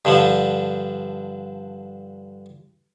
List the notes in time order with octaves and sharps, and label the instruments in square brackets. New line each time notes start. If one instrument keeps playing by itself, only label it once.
[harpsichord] G2 D3 F3